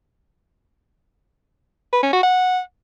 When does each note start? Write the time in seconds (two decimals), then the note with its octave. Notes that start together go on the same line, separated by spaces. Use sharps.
1.93 B4
2.03 C#4
2.13 F#4
2.23 F#5